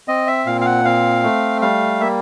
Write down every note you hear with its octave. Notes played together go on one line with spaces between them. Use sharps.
C4 D#5
E5
A#2 F5
F5
F#5
C4 F5
A3
G3 F5
A#3 E5